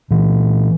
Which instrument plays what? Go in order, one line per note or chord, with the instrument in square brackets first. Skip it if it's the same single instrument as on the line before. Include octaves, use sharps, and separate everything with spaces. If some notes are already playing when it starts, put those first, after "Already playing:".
[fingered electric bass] A#2 E3